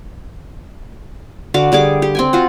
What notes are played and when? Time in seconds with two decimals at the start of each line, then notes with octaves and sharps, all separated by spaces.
1.54 D3 F#4 F5 D6
1.72 D3 G3 G#4 D6
2.02 G4
2.15 C4 G5 G#5
2.33 F4 F#4 F#5